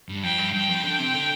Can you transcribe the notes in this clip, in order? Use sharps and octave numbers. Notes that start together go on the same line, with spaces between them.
G2
F2 G5
G2
G2 G5
F2
D3
C3
D3